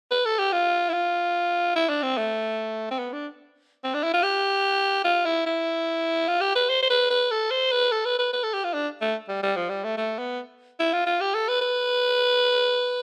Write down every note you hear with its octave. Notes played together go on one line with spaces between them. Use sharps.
B4
A4
G4
F4
E4
F4
E4
D4
C4
A3
C4
B3
D4
C4
D4
E4
F4
G4
F4
E4
E4
F4
G4
B4
C5
C5
B4
B4
A4
C5
B4
A4
B4
B4
B4
A4
G4
F4
D4
A3
G3
G3
F3
G3
A3
A3
B3
E4
F4
F4
G4
A4
B4
B4